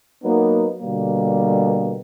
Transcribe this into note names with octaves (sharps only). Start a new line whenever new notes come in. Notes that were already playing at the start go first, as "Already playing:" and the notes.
F#3 A#3 B3 D#4
B2 D3 G3 A#3